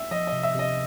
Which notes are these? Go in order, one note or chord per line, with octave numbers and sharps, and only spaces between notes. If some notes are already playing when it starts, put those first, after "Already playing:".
Already playing: E5
F3 D#5
D#5
C3
E5
C3 D#5